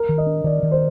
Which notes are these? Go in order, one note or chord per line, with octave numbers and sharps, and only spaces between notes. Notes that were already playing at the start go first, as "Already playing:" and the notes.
Already playing: A#4
D#3
D#5
D4
D#3 D5
D#3
C5